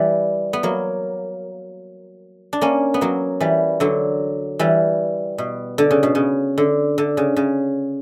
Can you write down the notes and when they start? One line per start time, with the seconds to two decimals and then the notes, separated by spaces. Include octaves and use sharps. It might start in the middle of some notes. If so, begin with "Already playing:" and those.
Already playing: E3 G3
0.53 B3
0.63 F#3 A#3
2.53 D4
2.61 A#3 C#4
2.94 B3
3.01 F#3 A#3
3.40 E3 G3
3.80 D3 F#3
4.59 E3 G3
5.38 B2
5.78 D3
5.91 C#3
6.03 B2
6.15 C#3
6.58 D3
6.98 D3
7.17 C#3
7.36 C#3